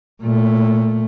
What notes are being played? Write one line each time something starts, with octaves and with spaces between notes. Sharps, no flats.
A#2 A3